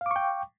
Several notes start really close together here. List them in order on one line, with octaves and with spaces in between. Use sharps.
F5 D6 C#6 G5